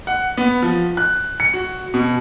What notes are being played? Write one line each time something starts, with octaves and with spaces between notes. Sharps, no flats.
F#5
B3
F3
F#6
C#7
F#4
B2